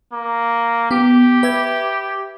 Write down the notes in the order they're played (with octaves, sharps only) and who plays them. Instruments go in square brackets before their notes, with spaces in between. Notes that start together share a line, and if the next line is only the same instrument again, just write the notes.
[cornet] A#3
[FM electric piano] B3 [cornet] G4
[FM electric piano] B4 E5 G#6